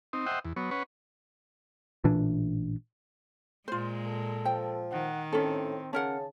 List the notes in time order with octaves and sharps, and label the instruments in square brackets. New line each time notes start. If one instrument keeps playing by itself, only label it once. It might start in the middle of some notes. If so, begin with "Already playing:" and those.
[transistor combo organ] C4 D#4
C5 D#5 E5 F#5 G5
E2
F#3 B3 C#5
C#4 B4 C#5 F#5
[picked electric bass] A1 A#2 E3 D4
[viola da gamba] A#2 G#3 [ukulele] F4 C5
[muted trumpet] A4
[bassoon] F3 [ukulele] G5
[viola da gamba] D#3 [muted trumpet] F#5
[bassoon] A2 [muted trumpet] C4 [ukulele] C#4 A4
[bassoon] C#3 [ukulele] C#4 A#4 F#5 [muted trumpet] A5